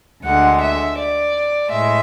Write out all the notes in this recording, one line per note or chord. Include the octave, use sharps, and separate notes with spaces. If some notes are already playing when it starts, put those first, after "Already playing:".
D2 D3 G#3 F#5
E5
D5
A2 G#3 E5